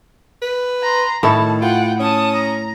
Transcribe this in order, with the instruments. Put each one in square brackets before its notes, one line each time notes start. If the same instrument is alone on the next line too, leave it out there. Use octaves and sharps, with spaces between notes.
[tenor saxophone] B4
[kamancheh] A#5 C6
[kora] A2 E4 A4 [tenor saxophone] D#3 [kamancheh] A5
[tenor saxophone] F4 [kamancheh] F#5 G5
[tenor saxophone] C#4 [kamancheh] A5 D#6
[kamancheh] A#5